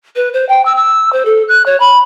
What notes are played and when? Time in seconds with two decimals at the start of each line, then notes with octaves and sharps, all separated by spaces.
0.16 B4
0.33 C5
0.49 G5
0.65 E6
0.76 E6
1.13 C5
1.25 A4
1.49 F#6
1.66 C#5
1.80 B5